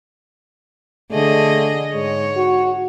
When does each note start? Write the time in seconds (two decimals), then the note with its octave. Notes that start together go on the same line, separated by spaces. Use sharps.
1.12 D3 A3 G#4 D#5
1.94 G#2 G#3 C#5
2.36 F#4